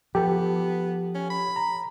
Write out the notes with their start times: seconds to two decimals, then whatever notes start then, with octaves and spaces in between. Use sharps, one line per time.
0.15 F3 B3 G4 A4
1.15 C#4
1.30 B5
1.56 A#5